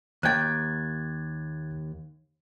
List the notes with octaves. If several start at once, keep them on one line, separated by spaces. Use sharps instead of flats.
D#2 G5 F#6 G#6 A6